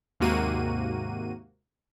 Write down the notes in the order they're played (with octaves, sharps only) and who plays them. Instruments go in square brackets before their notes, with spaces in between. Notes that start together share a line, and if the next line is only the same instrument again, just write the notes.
[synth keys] D#2 G#2 C3 A#3 F#4 D#7